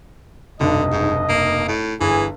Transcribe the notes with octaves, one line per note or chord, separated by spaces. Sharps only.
F1 B1 G2 D3 D#5
G#2
A#3
A2
G1 E3 G#4